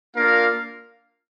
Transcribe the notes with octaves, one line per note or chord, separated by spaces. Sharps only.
A#3 D4 F4 A#4 F5